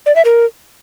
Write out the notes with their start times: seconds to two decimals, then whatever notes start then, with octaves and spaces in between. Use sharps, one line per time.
0.06 D5
0.16 E5
0.25 A#4